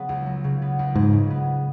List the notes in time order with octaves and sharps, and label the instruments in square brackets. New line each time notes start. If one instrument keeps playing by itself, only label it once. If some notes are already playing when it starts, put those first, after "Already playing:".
Already playing: [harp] C#3 F#3 B3
C#2
F#3
C#3
B3
C#2
[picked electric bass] G#2 [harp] G#3
[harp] C#3
B3